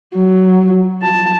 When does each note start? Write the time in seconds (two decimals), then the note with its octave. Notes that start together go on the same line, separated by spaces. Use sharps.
0.15 F#3
1.02 A5